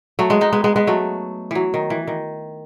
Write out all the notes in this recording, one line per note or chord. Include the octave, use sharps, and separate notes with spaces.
F#3 A3
G#3 B3
B3 D#4
G#3 B3
G#3 B3
G#3 B3
F#3 A3
E3 F#3
D#3
E3
D#3